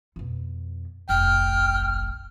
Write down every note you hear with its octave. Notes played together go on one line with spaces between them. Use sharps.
F2 B2
F1 A#1 G5 F6